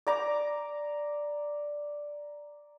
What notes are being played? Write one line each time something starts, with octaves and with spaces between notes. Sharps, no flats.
D5 A#5 D6